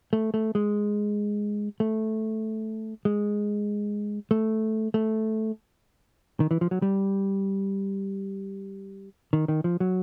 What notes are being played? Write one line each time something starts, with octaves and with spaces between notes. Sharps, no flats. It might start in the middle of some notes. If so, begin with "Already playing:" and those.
A3
A3
G#3
A3
G#3
A3
A3
D#3
E3
F3
F#3
G3
D#3
D#3
F3
F#3